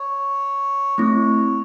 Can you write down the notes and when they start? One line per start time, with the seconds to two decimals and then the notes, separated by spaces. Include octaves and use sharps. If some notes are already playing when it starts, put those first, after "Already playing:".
Already playing: C#5
0.98 A3 C4 E4 C#5